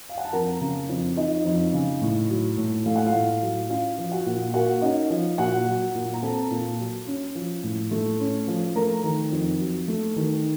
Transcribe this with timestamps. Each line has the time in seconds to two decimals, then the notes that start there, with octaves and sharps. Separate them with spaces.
0.09 F5
0.18 F#5
0.25 A5
0.33 F2 A#4 A#5
0.61 C#3
0.89 F2
1.17 F3 D#4 D#5
1.45 F2
1.74 C#3
2.01 A2
2.29 F#3
2.57 A2
2.86 A3 F5
2.96 F#5
3.06 F4 F5
3.14 A2
3.42 F#3
3.69 C#4 F4 F5
3.98 F3
4.12 F#4 F#5
4.26 A#2
4.54 A#3 F#4 F#5
4.82 C#4 D#4 D#5
5.10 F3
5.38 A#2 F#4 F#5
5.67 F#3
5.95 A#2
6.13 A#5
6.22 C4 A4 A5
6.51 A#2
6.79 F#3
7.07 C#4
7.35 F3
7.63 A2
7.91 A3
8.20 C#4
8.48 F3
8.75 A3 A#4 A#5
9.04 D#3
9.32 F2
9.60 F#3
9.88 A3
10.16 D#3